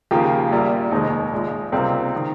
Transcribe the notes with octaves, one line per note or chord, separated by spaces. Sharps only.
D#2 C#3 F3 A#3 G4
A#1 A#2 G3 A#3
F1 D#2 D#3 G#3 D#4
A#1 A#2 G#3
C#2 C3 G3 A#3 C4
D#3